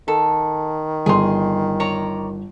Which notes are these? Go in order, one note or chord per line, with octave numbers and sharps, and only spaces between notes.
D#3 A4
G1 G#4 C6
C#5 D5 A#5